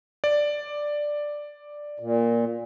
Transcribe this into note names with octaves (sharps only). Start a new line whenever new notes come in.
D5
A#2